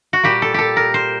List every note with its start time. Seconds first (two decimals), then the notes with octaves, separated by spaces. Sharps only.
0.13 F#4
0.23 A#2 G3 A#3 G4
0.42 A4
0.54 G4 A4
0.77 A#4
0.94 C5